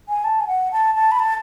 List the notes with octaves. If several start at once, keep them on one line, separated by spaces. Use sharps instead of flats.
G#5
A5
G#5
F#5
A5
A5
B5
A5